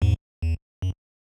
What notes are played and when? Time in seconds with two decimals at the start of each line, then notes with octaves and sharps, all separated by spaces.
0.02 E2 G#2
0.42 E2
0.82 F#2